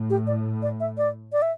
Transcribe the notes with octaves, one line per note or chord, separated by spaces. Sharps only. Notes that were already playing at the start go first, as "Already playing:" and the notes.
Already playing: A2
G4
D5
D5
E5
D5
D5
E5